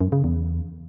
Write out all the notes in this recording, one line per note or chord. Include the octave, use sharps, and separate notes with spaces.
F#2
C#3
E2